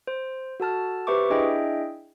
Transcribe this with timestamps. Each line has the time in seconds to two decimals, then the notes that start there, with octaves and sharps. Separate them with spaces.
0.07 C5
0.60 F#4 A4 A5 F6
1.07 G4 B4 C5 E5 C#6 D6
1.30 D4 E4 G#4 D#5 E5 G5